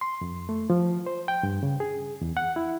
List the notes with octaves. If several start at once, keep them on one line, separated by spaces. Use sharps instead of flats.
C6
F2
A3
F3
C5
G5
G2
C#3
G#4
E2
F#5
E4